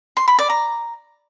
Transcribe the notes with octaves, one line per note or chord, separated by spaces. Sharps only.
C6
B5
D5
A#5